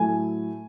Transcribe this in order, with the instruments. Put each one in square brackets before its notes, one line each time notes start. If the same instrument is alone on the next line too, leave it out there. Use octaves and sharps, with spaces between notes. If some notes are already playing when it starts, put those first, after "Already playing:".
Already playing: [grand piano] A2 F#3 A3 G#5